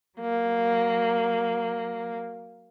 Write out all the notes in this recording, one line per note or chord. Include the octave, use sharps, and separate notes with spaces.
F#3 A#3